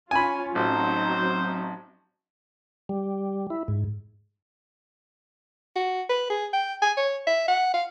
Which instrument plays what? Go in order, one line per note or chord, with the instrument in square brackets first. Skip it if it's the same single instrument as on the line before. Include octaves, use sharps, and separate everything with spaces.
[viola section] C#4 F4 [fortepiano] G#5 B5
[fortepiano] A1 [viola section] F#3 C4 D#4 [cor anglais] C5
[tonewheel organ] G3
E4
G#2
[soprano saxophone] F#4
B4
G#4
G5
G#5
C#5
E5
F#5
F5